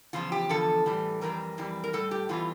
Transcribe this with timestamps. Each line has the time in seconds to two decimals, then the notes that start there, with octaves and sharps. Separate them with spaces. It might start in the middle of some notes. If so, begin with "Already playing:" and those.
0.13 E2 C#3 F3 F4
0.32 G4
0.49 E2 D3 F3 A4
0.86 A2 E3 G3
1.21 F2 C#3 E3 G3 A#4
1.58 F2 E3 G3
1.84 A#4
1.93 A2 G3 A4
2.11 G4
2.29 E2 E3 G3 F4